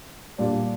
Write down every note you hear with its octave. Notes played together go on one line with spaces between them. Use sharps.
A#2 G3 D4